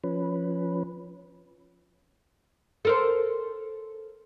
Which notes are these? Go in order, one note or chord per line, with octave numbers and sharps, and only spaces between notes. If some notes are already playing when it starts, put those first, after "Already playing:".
F3 C#4 B4
A4 A#4 C5